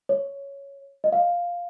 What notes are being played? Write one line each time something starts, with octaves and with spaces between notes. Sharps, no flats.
C#5
D#5
F5